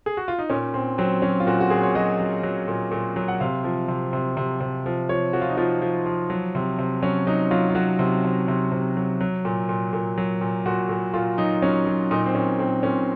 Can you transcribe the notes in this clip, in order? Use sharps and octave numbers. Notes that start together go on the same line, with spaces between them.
G#4
F#4
F4
D#4
A#2 C#4
A#2 C4
F#3 C4
F#3 C#4
F4
A#2 F#4
F#4
A#2 G#4
C#5
F#3 D#5
F#3
F#3
A#2
A#2
F#3
F#5
C3 F5
F3
C3
C3
C3
C3
F3
F3 C#5
F3 F#4
F4
D#4
F3 F4
F3
F3
F#3
C3
C3
F#3 C#4
F#3 D#4
F#3 F4
F4
F#3 F#4
C3
C3
C3
C3
F#3
F#3
A#2
A#2
A#2
F#3
A#2
A#2 F#4
A#2
A#2 F4
F#3 D#4
F#3 C#4
F#3
A#2 D#4
C4
A#2 C#4
A#2 C4
A#2 C#4